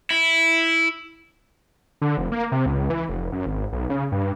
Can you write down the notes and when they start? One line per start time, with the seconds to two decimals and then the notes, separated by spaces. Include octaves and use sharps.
0.10 E4
2.01 D3
2.18 F1
2.32 A#3
2.52 C3
2.66 C#2
2.90 E3
3.09 F1
3.32 F#2
3.46 G#1
3.73 B1
3.90 C#3
4.12 G2